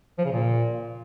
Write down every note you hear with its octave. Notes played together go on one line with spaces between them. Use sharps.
F3
C#3
A#2